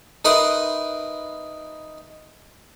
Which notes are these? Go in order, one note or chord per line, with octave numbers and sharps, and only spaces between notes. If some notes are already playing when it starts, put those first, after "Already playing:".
D#4 A#4 B4 E5 C6 D#6